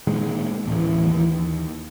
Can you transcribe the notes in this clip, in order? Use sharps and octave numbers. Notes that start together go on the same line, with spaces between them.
A#2 D#3 G#3
D1 A1 E3
D#2